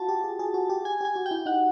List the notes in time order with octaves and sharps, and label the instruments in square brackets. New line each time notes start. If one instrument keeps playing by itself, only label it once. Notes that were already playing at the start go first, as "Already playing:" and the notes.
Already playing: [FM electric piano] F4 F#4 [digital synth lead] A5
[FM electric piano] G4
G#4
G#4
F#4
G4
[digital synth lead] G#5
[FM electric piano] G4 [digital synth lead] G#5
[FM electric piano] F#4
[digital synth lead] G5
[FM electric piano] E4
[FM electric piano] D#4 [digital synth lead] F#5